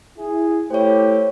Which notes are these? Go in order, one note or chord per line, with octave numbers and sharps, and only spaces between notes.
E4 G#4
A3 E4 G4 C5 C#5